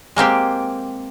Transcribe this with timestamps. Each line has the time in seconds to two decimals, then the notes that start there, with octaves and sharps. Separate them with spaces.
0.16 G#3 A#3 C4 G4